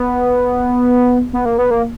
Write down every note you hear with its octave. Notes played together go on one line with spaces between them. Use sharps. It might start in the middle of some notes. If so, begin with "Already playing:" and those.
Already playing: B3
B3
A#3
B3
A#3